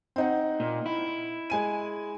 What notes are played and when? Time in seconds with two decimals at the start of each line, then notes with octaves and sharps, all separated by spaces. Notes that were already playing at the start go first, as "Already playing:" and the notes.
0.16 C4 D#4 F#5
0.60 A#2
0.86 E4
1.50 G#3 G#5 D#7